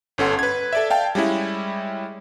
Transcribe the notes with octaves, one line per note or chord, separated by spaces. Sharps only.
G1 C#4 A4 F#5 C6
B4 G#6
A4 D5 E5
F5 G5 A5
G3 G#3 C#4 E4